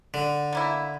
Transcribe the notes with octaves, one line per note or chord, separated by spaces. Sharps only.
D3
A3 A#3 E4